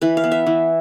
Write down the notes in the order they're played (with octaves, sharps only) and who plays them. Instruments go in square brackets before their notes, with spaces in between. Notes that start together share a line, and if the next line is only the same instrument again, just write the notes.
[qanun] E3 B4
F5
B3
E5
E3